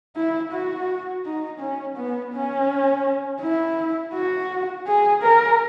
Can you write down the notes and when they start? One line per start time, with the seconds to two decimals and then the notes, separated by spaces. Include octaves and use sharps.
0.16 E4
0.52 F#4
1.25 D#4
1.60 C#4
1.97 B3
2.33 C#4
3.42 E4
4.14 F#4
4.87 G#4
5.22 A#4